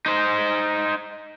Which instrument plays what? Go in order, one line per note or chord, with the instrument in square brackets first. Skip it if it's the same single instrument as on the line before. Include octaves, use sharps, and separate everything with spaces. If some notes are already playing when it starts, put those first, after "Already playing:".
[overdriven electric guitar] D#4 C5